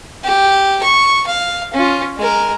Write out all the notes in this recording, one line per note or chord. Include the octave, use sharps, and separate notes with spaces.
G4
C#6
F5
C#4 F4
G#3 A#4